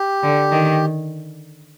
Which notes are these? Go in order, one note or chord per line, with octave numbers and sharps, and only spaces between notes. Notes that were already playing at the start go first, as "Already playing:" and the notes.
Already playing: G4
D3
D#3